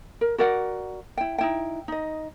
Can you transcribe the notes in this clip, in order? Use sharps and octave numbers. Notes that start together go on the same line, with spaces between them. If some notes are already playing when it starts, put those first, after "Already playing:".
A#4
F#4 A#4 D5 F#5
E4 G5
D#4 E4 G5
D#4 D#5